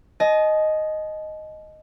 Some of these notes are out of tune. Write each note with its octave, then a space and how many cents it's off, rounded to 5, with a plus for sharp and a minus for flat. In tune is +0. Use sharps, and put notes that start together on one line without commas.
D#5 +0 A5 -45